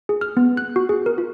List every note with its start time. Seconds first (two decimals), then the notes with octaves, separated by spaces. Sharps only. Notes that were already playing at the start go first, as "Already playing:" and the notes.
0.09 G#4
0.21 F6
0.37 B3
0.57 F#6
0.76 F#4
0.89 G#4
1.06 A#4
1.18 F4